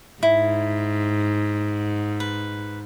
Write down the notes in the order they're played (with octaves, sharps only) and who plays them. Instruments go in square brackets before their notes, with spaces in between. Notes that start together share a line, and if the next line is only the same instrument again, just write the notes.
[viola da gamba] G#2 [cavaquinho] E4
[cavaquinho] B4